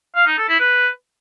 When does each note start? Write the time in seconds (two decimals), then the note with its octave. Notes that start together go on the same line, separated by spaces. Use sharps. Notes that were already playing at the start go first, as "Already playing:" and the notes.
0.16 F5
0.27 D#4
0.38 A4
0.49 E4
0.60 B4